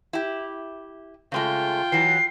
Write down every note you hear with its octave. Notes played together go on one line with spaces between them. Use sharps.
E4 G4
C#3 G#3 A3 F4 G5
E3 F#3 C7